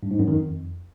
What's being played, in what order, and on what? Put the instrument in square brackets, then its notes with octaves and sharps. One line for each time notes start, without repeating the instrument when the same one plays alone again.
[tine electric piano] G2
G#2
F#2
D#3
F2